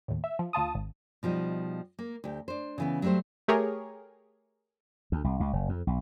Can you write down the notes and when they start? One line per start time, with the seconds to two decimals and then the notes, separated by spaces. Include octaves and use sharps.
0.08 D#2 A2
0.24 E5
0.39 F3
0.53 D2 F4 A5 D#6
0.75 G#1
1.23 B2 F3 G3 D#4
1.99 A#3
2.24 D2 G4
2.48 D4 C5
2.78 C#3 E3 B3
3.02 F#3 G3 A3 G4 C5
3.48 A3 G4 G#4 A#4 C#5
5.12 D2
5.24 C2
5.40 C#2
5.53 F#1
5.69 F2
5.87 B1